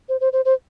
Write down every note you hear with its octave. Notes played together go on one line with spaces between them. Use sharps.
C5
C5
C5
C5